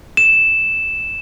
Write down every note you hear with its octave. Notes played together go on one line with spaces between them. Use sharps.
E7